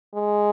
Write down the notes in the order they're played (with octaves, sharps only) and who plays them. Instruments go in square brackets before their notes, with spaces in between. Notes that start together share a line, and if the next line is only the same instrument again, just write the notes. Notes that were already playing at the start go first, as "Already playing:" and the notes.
[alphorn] G#3